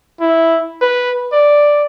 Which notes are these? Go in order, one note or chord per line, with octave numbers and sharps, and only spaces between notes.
E4
B4
D5